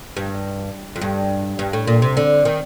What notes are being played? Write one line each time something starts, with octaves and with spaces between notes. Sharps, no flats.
G2
F2
G2
G2
A2
A#2
C3
D3
D#3